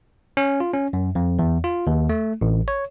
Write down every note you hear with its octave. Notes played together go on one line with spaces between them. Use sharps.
C#4
F4
C#4
F#2
F2
E2
F4
D#2
A3
A1
C#5